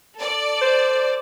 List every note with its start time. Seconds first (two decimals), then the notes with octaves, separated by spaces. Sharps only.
0.16 A4 D5
0.61 C5